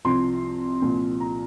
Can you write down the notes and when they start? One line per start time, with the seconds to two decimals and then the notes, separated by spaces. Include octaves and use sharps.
0.05 C2 C3 F3 C6
0.82 C2 A#2 F3
1.20 A#5